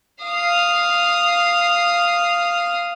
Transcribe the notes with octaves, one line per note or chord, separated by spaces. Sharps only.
F5 D#6